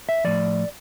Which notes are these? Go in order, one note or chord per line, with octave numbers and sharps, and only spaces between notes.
E5
A2 F3 D5